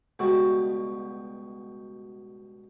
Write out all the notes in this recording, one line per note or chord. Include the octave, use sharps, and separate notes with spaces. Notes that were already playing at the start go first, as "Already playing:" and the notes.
C#2 B2 G3 F#4